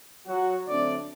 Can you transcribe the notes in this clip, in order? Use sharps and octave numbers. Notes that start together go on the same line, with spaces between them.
F#3 F#4
D3 F#3 A3 C4 D4 D5